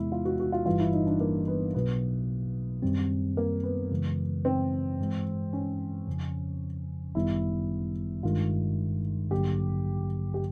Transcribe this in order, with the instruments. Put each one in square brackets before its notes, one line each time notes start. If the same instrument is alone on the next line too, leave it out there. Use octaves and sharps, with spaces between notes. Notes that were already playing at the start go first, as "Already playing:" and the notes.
Already playing: [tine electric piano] E2 C3 E3 G#3 B3 [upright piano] E4
[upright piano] F4
F#4
F#4
F4
[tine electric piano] G1 G2 E3 G3 [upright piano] F4
[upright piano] E4
D#4
D4
A#3
B3
[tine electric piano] B1 B2 F#3 [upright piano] B3
[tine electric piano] F#2 D#3 G3 C4
[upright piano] A#3
B3
[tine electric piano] F#2 C#3 E3 G#3
[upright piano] C4
[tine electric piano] G2 E3 G#3
[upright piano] C#4
[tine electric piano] F2 C#3 F3
[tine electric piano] G1 F#2 D#3 G3 B3 [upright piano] E4
[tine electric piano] G1 G2 D#3 G#3 [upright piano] F4
[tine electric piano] A1 G2 D3 F#3 A#3 [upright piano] G4
[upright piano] G4